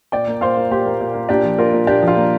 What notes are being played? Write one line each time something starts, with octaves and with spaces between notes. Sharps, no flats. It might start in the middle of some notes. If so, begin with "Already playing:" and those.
A#2 D5 G5
A#3
A#2 C5 F5
A#3
A#2 G4 C5
A#3
A#2
A#3
A#2 D4 G4
F3
A#3 F4 A#4
A#2
A#2 D4 G4
F3
F4
A#3